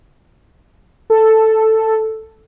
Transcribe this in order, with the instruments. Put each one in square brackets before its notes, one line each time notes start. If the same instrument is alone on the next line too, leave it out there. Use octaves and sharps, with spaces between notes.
[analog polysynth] A4